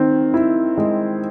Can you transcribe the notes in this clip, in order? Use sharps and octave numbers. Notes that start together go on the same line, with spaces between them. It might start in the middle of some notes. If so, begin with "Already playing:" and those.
Already playing: D#3 C4
E4
G#3